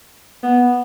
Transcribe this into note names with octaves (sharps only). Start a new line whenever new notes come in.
B3